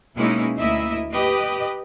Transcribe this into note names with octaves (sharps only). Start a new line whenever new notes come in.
B2 G#3 A#3 C#4 D#4 E4
D2 A#3 E4 D#5 E5
G4 B4 D#5